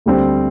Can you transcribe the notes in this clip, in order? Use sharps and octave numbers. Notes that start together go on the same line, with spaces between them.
D2 D3 G3 C4